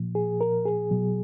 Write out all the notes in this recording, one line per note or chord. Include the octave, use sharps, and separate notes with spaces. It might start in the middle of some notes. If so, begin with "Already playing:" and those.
Already playing: A#2 F3
G#4
A#4
G#4
B2 F#3